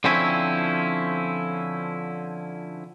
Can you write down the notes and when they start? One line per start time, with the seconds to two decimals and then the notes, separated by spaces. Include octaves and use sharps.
0.04 D3 F3 C4 C#4 E4